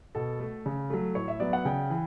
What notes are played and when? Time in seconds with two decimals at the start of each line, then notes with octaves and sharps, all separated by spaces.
0.15 B2 A4
0.40 A3
0.66 C#3
0.90 F#3 A3
1.15 A2 C#5
1.28 E5
1.40 F#3 B3 D5
1.53 F#5
1.65 C#3 G5
1.90 E3